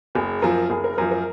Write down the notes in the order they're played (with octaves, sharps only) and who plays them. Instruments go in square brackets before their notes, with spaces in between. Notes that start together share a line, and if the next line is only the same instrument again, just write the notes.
[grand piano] F#1 [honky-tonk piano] G#4
[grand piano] F#2 F3 [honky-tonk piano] A#4
[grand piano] F#1 [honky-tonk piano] G#4
[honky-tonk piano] A#4
[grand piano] F#2 F3 [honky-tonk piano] A#4
[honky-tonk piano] A#4